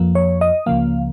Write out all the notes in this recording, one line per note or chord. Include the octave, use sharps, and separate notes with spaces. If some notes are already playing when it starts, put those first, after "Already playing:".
Already playing: F2 F3 A#3
C#5
D#5
C#2 C#3 F3 A#3 F5